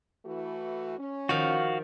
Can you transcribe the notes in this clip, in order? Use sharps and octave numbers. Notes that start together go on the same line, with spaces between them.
E3 A3 F#4
C#4
D#3 F3 F#4 F5